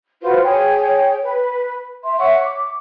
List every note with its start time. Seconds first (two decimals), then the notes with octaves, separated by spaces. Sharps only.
0.22 F4 F#4 B4 C5
0.44 G#4 C#5 G5
1.22 B4
2.04 E5 C6
2.19 C#5 E5 F#5 C#6
2.44 D6